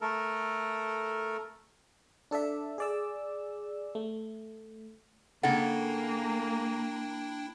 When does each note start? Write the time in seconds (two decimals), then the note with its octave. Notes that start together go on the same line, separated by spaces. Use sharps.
0.01 A3 A4 A#4
2.31 D4 A4 D5 E5
2.78 G#4 D5 E6
3.95 A3
5.43 C#3 A#3 D4 E4 A4 F#5 G5